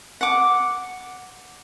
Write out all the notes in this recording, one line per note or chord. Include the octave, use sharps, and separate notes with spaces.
F#5 D6